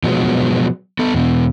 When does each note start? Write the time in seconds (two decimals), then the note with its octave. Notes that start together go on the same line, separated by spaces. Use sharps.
0.04 B2 F3 F#3 G#3 A3 B3
0.99 B3 A4
1.13 E2 B2